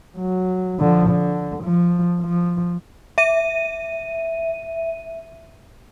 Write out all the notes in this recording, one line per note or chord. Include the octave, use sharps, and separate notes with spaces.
F#3
D3 F3
D3
F3
F3
E5 D#7